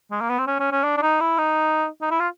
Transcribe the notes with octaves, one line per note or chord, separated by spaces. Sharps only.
G#3
A#3
B3
C4
C#4
C#4
C#4
D4
D4
D#4
E4
D#4
D#4
E4
F4